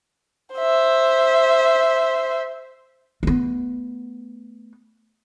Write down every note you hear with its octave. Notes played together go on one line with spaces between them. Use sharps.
C5 E5
A3 B3